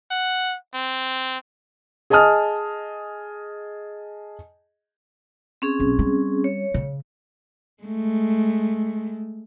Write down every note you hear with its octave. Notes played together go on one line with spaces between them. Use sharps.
F#5
C4
G#4 D#5 G#5 A5 D#6 F6
C4 C#4 G#4
B1
G3
C#5
C#3
G#3 A3